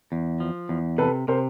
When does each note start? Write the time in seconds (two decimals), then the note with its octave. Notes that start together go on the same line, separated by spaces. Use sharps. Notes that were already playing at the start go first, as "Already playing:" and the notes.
0.12 E2
0.40 F3
0.69 E2
0.98 C3 A4 B4
1.28 C3 A#4 C5